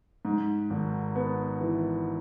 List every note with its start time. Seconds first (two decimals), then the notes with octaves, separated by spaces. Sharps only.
0.25 G#2
0.70 G#1
1.16 B3
1.61 E3